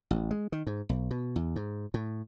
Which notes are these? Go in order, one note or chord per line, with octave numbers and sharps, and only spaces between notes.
A1
G#3
D#3
G#2
B1
B2
E2
G#2
A2